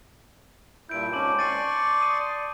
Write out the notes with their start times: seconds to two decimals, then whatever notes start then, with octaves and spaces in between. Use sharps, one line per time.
0.89 G2 A#2 E4 G6 D7
1.13 G#2 C4 C#4 A5 D6 F#7
1.39 D5 C6 C#6 A6 D#7
2.01 D#6 D#7